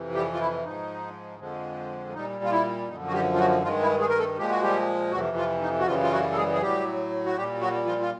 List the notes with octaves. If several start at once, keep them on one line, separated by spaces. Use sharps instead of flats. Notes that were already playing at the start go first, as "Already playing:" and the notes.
Already playing: F2 C3 E3
G3 G4
F4
E4
G#2 F3 G#3 D#4
F2 D3 F3 G#3
A#2 G3 D#4
F4
E4
F#2 D3 F3 D#4
F#4
G3 G4
F4
F#3 F#4
G2 D#3 F3 G#3 F4
E4
G#3 G#4
A#4
A3 A4
A#2 F3 G#3 G4
F#4
G3 G4
F2 C3 E3 F#3 F#4
F3 F4
D#4
F#4
F#2 C#3 E3 F3 G3 F4
F4
F#3 F#4
A4
G#3 G#4
G#4
A2 F#3 G3 G4
F#4
A#2 G3 G4
F#3 F#4
F3 F4
F4